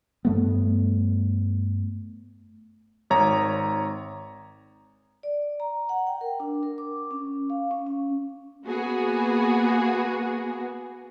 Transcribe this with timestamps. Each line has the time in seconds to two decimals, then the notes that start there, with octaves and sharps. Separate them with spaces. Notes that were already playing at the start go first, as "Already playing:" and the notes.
0.25 G2 A3 B3
3.10 G#1 C#5 A#5
5.23 D5
5.60 A#5
5.89 F#5
6.07 G5
6.21 A#4
6.40 D4
6.63 A#4
6.78 D6
7.11 C#4
7.50 F5
7.71 C#4
7.87 C#4
8.65 A#3 B3 F#4 G#4